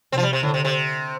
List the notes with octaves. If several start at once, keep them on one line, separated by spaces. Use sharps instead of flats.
C3 C4
F3
G3
C3
A2 D3
C3
C3